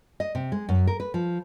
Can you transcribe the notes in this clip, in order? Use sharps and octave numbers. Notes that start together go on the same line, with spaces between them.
D#5
C3
G#3
F#2
A#4
B4
F3